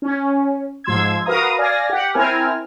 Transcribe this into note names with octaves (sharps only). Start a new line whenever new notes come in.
C#4
G#2 F3 C6 E6 G#6
F#4 A#4 B4 F5 A#5 D#6
D5 F5 G#5 A#6
G4 F#5
C4 E4 A#4 G#5 F6